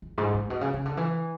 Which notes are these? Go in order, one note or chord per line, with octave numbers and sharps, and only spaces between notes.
E2
G#2
A2
B2
C#3
C#3
D3
E3